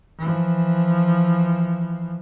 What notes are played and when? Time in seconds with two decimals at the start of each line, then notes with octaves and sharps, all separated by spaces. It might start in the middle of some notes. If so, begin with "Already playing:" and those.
0.18 E3 F3